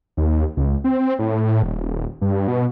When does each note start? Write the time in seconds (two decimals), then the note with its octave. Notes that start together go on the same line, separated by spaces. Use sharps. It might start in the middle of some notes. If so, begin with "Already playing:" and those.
0.17 D#2
0.57 C#2
0.84 C4
1.19 A2
1.63 D#1
2.21 G2
2.48 B2